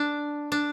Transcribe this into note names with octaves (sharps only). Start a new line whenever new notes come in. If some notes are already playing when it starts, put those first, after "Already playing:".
Already playing: D4
D4